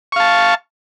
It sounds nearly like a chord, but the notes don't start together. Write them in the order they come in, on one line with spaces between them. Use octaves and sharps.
C#6 F5 A5